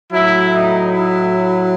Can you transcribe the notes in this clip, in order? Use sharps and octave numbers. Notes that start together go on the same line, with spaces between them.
A2 F#3 E4
D#4
E4